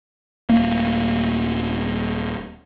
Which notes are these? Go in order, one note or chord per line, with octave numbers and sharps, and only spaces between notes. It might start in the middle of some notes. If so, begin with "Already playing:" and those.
D#1 A3 A#3